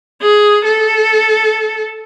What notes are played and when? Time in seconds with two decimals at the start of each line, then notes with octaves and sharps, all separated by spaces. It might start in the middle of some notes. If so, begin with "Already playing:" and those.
0.22 G#4
0.64 A4